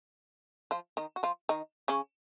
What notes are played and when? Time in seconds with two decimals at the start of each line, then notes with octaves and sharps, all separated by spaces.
0.71 F3 F4
0.97 D#3 D#4
1.16 F#4
1.23 F3 F4
1.49 D#3 D#4
1.88 C#3 C#4